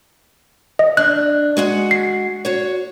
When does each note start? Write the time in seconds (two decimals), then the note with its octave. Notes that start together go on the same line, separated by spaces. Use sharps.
0.79 D#5
0.97 D4 F#6
1.57 G#3 F#4 F#5
1.91 C7
2.45 F#4 C#5